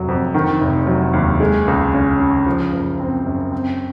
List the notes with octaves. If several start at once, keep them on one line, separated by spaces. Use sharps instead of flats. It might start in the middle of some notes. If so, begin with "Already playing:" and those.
Already playing: F1 F#3
F2
D#3
F1
F#3
D#2
G#3
C#2
C#4
C#3
F3
F#1
C4
F#2
C4